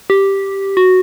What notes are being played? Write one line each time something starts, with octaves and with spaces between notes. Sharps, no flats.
G4
F#4